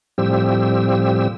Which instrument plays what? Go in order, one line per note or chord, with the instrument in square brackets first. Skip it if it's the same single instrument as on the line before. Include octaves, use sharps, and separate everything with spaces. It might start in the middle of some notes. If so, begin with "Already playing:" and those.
[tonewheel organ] A2 F3 G3 C4 G4 E6